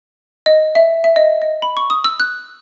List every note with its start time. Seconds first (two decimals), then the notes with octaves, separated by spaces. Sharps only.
0.46 D#5
0.75 E5
1.04 E5
1.16 D#5
1.42 D#5
1.62 B5
1.77 C#6
1.90 D#6
2.04 E6
2.20 F#6